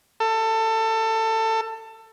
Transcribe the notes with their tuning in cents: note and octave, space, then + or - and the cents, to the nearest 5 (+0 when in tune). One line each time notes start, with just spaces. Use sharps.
A4 +20